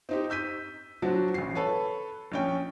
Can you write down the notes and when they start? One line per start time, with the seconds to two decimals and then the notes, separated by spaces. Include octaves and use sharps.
0.09 C4 D#4 G4
0.30 E6 G6 B6 D#7
1.02 F#3 C4 D4 F#4
1.34 A1 C7
1.55 A4 B4 C#5
2.32 A#1 C#4 G5